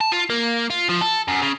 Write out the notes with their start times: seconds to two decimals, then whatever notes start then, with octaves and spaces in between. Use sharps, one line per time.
0.01 A5
0.12 F4
0.30 A#3
0.70 F4
0.89 F3
1.01 A4
1.28 F#2
1.42 C#3